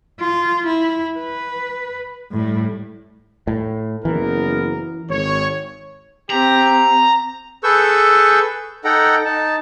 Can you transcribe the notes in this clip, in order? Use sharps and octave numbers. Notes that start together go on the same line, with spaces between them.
F4
E4
B4
A2 G3
A2
F#1 E3 B3 A#4
G#1 C#5
C4 G4 A#5
G#4 A4 B4 C#6 E6 G6
D#4 A4 F#5 G5 A#5
D#4 A5